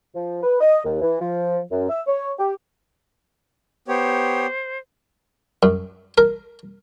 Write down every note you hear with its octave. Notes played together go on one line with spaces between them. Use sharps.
F3
B4
D#5
D#2
E3
F3
F#2
E5
C#5
G4
B3 G4 C5 C#5
F#2
A#4